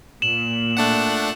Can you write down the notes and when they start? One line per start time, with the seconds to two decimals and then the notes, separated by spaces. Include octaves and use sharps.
0.22 A#2 E7 F#7
0.77 A3 D4 F#5